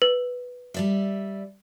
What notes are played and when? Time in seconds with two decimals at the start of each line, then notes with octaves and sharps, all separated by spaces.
0.02 B4
0.74 G3 D5 E5